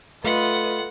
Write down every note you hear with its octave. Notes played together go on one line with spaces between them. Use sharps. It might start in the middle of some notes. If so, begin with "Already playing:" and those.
A3 F4 B4 D#5 F#5